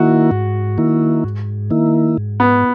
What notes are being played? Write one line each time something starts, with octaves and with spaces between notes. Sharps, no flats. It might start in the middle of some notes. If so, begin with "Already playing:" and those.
Already playing: D#3 A#3 E4 F#4
G#2
D#3 A#3 E4
G#2
D#3 A#3 E4
G#2
B3